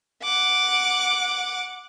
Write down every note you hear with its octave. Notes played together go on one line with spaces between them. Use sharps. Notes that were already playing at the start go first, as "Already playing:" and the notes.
F#5 D6